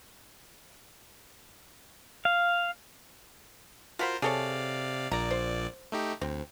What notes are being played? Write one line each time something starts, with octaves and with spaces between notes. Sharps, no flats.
F5
F4 F#4 A#4 C5 F5 B5
C3 G#4 A4 C#5 D5 F5
A#1 A#2 D5 A#5
C5
A3 D#4 G4
D2 C4